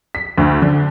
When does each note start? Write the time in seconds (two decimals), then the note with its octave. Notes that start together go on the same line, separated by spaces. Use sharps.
0.15 B6
0.38 D2
0.62 D3